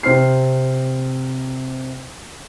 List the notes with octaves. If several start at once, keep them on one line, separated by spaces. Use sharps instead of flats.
C3 C4 F6 C7